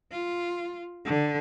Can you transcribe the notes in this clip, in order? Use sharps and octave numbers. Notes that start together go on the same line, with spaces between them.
F4
D3